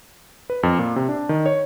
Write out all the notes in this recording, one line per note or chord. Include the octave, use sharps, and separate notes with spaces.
B4
F2
A#2
C3
D4
D#3
C#5